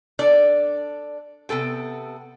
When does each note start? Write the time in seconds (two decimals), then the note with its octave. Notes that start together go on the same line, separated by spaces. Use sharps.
0.19 D4 A4 D5
1.49 C3 B3 A4 G5